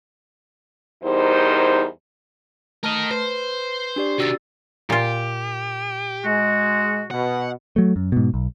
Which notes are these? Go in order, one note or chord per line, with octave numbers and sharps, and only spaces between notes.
E2 G3 D#4 A#4 C5
A3 A#4 D#5 A5 F6
B4 C5
D4 G4 D5
C3 D#3 F#4 E6 A6
A#2 F4 G4
G#3 F#4
B2 F#5
F#3 A3
F#2
G#2 B2
B1